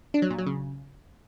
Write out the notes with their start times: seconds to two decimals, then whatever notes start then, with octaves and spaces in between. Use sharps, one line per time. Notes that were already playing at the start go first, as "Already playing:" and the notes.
0.14 D4
0.22 F#3
0.30 A#2
0.38 F#3
0.47 C#3